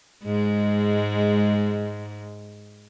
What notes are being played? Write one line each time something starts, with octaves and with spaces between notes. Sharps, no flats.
G#2 G#3